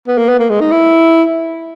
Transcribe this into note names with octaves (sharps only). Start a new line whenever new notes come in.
B3
A#3
B3
A#3
G#3
D#4
E4